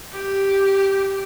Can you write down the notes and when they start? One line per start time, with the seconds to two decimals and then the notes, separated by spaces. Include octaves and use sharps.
0.13 G4